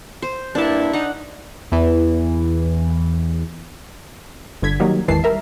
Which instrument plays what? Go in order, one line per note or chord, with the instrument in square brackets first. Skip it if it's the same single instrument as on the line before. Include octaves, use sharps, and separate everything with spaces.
[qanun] C5
[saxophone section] G2 A#3 E4 [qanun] D4 A5
[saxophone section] D#4 [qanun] F#5
[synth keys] E2 E3
[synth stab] G1 D3 G#6 B6
D#3 F#3 G3 A#3 D#4
G#1 E2 D#3 E3 A5 C7
G3 A#4 E5